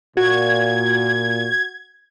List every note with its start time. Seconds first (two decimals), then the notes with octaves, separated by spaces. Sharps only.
0.17 A#2 F#4 G#6